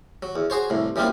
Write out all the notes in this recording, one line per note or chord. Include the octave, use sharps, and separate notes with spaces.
F#3
E2
F#4 G#4 C5 C#5
C2 A2
F#2 E3 G3 A#3 C4 F4